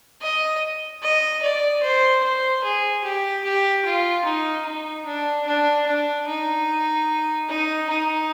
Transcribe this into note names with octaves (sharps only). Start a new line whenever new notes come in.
D#5
D#5
D5
C5
C5
G#4
G4
G4
F4
D#4
D#4
D4
D4
D4
D#4
D#4
D#4